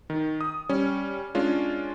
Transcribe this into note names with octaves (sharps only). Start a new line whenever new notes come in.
D#3
D#6
G3 C#4
G#3 C#4 D4 F4